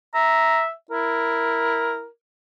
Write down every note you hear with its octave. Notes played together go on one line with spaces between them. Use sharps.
E5 A#5
E4 A#4